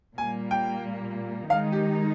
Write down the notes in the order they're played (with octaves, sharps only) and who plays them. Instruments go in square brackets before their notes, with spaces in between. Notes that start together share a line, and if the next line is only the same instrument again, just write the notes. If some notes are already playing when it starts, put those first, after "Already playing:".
[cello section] A#2 G3 A#3 [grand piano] G#5
[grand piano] G5
[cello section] D#3 G#3 D#4 [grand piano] F5
[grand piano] G4